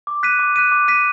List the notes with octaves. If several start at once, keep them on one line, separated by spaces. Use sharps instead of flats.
D6
F#6 B6 D#7
D6
F#6 B6 D#7
D6
F#6 B6 D#7